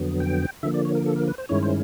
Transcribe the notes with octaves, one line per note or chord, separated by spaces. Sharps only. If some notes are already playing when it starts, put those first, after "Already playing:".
Already playing: F2 D3 F#3 B3
G5
D3 F3 A#3 E5
D5
C#5
A#4
A4
A#4
B4
C5
G2 D#3 G#3 C#4 E4 C#5
C5